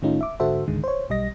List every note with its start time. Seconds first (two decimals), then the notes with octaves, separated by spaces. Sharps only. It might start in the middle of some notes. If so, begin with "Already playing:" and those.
0.02 A2 D#3 A3 C#4 D#4 F4
0.21 E5 D6
0.40 G#2 D3 F#4 A4 C5 E5
0.68 C#2 G#2 D3 D#3 G#3
0.84 C5 C#5
1.10 B1 G3 D#5 A#6